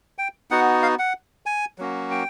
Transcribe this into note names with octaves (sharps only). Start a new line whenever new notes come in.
G5
B3 D#4 F#4 F#5
F5
F#5
G#5
F#3 A#3 C#4 F#4
G5